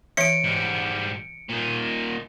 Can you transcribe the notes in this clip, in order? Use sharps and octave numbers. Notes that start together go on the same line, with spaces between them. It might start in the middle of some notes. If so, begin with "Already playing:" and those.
E3 C#5 E5 C#7 D7
G#2 G3
A#2 D#4